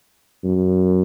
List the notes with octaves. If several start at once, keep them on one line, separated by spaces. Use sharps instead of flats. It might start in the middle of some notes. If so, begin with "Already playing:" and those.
F#2